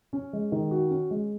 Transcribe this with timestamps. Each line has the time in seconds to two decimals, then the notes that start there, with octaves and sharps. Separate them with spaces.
0.13 C#4
0.33 G#3
0.52 D#3
0.71 F#4
0.90 C#4
1.11 G#3